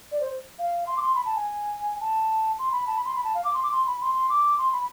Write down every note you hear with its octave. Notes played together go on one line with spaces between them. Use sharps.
D5
C5
F5
C6
D6
C6
B5
A5
G#5
A5
C6
B5
A5
B5
C6
B5
A5
F5
D6
C6
D6
C6
B5
C6
C6
D6
C6
B5